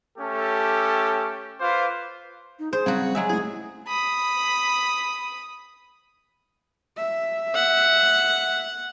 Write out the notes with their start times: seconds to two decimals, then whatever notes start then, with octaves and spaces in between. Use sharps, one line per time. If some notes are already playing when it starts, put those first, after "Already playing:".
0.19 A3 C#4 G4 A4
1.61 F4 B4 C5 F5 D6
2.59 D#4
2.73 G#4 C5
2.86 C#3 F#3 G3 C4 F#4 F#5
3.15 F#3 G#3 E5 G#5
3.29 A3 E4 G#4
3.87 B5 D#6
6.97 E5
7.54 F#5